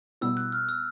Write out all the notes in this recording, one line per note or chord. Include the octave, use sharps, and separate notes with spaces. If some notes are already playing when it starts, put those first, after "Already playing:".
B2 G3 B3 E4 E6
F#6
F6
E6